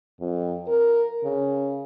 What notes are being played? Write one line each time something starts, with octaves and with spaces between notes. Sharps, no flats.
F2
A#4
C#3